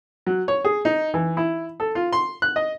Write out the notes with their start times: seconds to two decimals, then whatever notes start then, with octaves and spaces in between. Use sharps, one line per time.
0.27 F#3
0.48 C#5
0.64 G#4
0.85 D#4
1.14 E3
1.37 E4
1.80 A4
1.95 F4
2.13 C6
2.42 F#6
2.56 D#5